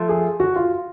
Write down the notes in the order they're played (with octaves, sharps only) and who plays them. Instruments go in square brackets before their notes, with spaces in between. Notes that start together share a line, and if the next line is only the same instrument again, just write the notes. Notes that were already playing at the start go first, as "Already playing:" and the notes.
Already playing: [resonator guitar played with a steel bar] F3 A3
[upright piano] G#4
F#4
F4